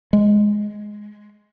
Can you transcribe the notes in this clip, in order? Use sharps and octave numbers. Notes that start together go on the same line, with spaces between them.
G#3